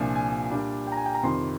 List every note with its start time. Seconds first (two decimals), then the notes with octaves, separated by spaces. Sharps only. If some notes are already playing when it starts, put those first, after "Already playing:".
Already playing: C2 A#2 F3 A#3 D4 G#5
0.15 G#5
0.51 A#2 G3 D4
0.87 G5
0.92 A#5
0.97 G#5
1.05 G5
1.14 A#5
1.23 F2 C3 D#3 G3 C6